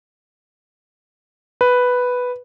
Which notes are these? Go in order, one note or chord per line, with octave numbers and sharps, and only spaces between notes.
B4